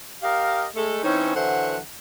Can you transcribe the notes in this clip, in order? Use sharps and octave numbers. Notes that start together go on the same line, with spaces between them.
G4 A#4 D#5 F5
G#3 A3 A4
E3 C4 C#4 D#4 C5 C#5
D3 E3 F#3 C5 E5 F#5